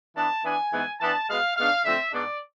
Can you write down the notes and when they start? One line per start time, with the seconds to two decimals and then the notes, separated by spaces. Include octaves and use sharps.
0.16 E3 B3 D4 A5
0.43 E3 B3 D4 G#5
0.72 G#2 E3 G#3 B3
0.99 E3 B3 D4 A5
1.28 B2 G#3 B3 F5
1.56 G#2 G#3 B3 D4 F5
1.83 D3 F3 A3 C4 E5
2.12 G#2 G#3 B3 D4 D5